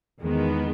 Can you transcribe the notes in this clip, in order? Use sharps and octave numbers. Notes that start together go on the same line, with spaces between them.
E2 D#3 G#3 B3